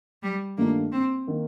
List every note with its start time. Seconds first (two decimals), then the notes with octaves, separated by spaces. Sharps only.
0.23 G3
0.58 G2 D#3 A3 A#3 D4 F4
0.92 C4
1.27 D#3 A#3